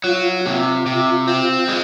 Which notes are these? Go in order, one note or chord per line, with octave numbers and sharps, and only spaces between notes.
F#3 F4
C3 F4
C3
C4
G#3